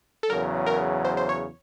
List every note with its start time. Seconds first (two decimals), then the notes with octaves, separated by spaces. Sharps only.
0.23 A4
0.30 E2 C#3 F#3 A#4
0.66 A#4
1.05 C5
1.17 C5
1.29 C#5